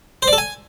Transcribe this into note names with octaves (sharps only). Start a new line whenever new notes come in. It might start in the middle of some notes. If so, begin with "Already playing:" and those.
C5
D5
A4
G#5